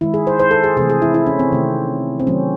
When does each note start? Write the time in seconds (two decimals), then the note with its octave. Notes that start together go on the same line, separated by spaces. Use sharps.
0.01 D#3 G#3 E4
0.14 G#4
0.27 C5
0.40 C5
0.51 A4
0.64 G#4
0.77 C3 E3 A3 G#4
0.90 G#4
1.02 E4
1.14 E4
1.26 C#4
1.39 C4
1.53 C3 D#3 A3
2.20 C4
2.27 D#3 F#3 A3 C#4